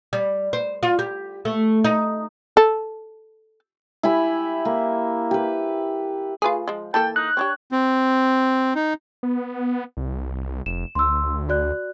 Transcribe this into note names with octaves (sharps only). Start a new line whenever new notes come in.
G3
C5
F4
G4
A3
D#4
A4
E4 G4 G#5 B5
A#3
G4 B4
A3 F4 G#4 B4
F3 G#3
E3 A#3 A4 G5 A5
D#4 F#6
C4 D4 G4 C#5
C4
D#4
B3
C2
F1 E7
D2 C6 E6
F#4 D5 F#6